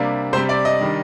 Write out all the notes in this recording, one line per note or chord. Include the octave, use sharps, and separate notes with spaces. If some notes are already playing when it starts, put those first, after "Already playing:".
Already playing: C3 G3 A#3 D4
C3 G3 C4 C5
D5
D#5
D#3 G3 D4